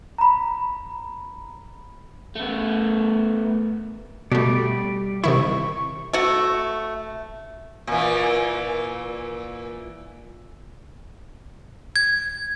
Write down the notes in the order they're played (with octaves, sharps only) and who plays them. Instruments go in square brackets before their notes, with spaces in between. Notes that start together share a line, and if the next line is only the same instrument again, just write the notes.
[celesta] A#5 B5
[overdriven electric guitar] A3 B3
[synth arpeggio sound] B2 A3 [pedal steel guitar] G3 D5
[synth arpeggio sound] C3 D#3 E4 [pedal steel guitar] C#6
[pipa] A3 F#4
[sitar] A#2 E3
[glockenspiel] G#6